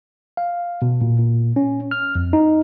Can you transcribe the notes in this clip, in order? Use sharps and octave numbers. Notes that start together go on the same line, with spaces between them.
F5
B2
A#2
A#2
C#4
F6
F2
D#4